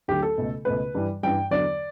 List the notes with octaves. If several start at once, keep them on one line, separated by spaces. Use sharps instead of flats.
D2 D3 F#3 A3 G4
A4
C#2 B2 A3
C#2 B2 A3 B4
G2 E3 G3
G2 E3 G3 G5
E2 D3 F#3 D5